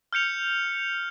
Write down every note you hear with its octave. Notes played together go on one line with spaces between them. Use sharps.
F6 G6 C#7 F7